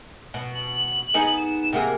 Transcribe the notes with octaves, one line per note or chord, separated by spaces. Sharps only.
B2
F#7
B3 D#4 G#4
E7
C3 A#3 G#4 F#5